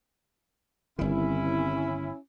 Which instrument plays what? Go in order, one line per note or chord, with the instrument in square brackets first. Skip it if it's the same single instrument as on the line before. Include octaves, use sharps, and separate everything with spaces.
[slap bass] G1 D#3 [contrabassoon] C2 [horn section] C#4 E4